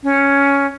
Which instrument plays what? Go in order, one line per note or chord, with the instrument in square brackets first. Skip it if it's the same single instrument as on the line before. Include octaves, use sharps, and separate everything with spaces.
[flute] C#4